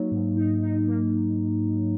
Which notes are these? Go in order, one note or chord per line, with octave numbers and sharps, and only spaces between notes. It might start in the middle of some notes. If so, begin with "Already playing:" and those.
Already playing: F#3 A#3 D#4
G#2
D#4
D#4
A#3